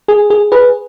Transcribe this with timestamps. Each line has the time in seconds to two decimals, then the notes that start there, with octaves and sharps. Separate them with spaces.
0.08 G#4
0.30 G#4
0.52 G#4 B4